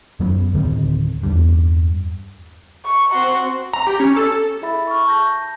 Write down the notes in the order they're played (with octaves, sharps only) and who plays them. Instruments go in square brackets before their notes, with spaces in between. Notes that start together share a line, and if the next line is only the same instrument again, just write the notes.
[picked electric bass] F#2 F#3 B3
D1 D3 D#3 C4
E2 G2
[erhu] C#6
[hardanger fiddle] C4 C6 [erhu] F#4
[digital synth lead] A#5
G4
C#4
A4
[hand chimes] E4 G#4 E5 B5 A6
C#6 F6
A5 G6 A#6